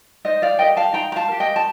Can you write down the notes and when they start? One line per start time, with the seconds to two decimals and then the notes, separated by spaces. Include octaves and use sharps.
0.25 D#4 C5 D#5
0.42 D5 F5
0.59 G4 A#4 D#5 G5
0.77 F5 A5
0.93 D#4 G5 A#5
1.12 A#5
1.16 F5 A5
1.28 G4 A#4
1.40 D#5 G5
1.56 A5